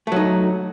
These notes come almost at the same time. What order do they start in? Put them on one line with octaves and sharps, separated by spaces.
A3 F#3 D#4